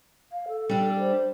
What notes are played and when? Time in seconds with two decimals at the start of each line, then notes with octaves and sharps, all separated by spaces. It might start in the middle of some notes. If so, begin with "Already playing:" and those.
0.32 F5
0.48 A4
0.69 G3 D4
0.99 C5